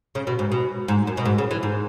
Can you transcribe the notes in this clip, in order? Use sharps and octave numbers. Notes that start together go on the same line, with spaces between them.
C#3
B2
G#2
B2
G#2
F#2
B2
G#2
C#3
E3
G#2